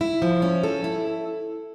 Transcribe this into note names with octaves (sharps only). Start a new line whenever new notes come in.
E4
F3
C#4
A4
E4